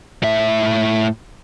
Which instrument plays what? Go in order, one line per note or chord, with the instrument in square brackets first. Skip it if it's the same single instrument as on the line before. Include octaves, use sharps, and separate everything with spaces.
[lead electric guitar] A2 E5